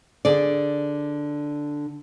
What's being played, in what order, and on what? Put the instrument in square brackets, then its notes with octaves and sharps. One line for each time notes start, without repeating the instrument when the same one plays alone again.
[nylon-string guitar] D3 G#4 D5